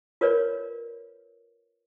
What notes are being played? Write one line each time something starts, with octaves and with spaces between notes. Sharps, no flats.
F4 A#4 B4 C#5 D5